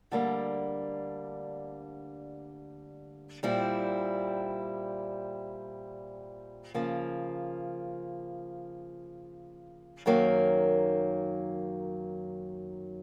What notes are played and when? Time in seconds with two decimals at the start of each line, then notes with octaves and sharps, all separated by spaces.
0.11 D2 D3 G3 A#3
3.43 A#2 G3 C4 E4
6.74 C#3 F3 A#3
10.06 F#2 D#3 F#3 A#3